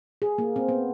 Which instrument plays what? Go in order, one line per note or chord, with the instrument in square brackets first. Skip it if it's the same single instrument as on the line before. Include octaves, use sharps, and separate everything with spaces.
[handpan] G#4
A#3
C4
B3